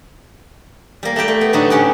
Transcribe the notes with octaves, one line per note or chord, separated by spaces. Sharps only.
G3 A#3
A3 E4 G4 G5
A3
B3
A2 D3 F#3 D#4 E4 F#4
A2 C#4 G4 F#5 G5